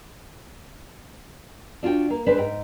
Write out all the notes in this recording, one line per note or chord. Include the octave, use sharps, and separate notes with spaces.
D4 F4 F#4 G5
A#3
G3 G#3 D4 B4 C5
G#2 G5